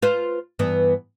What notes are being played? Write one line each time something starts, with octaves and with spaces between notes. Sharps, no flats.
F4 B4 C5
G2 E3 B3